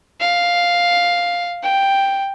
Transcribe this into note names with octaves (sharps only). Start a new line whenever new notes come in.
F5
G5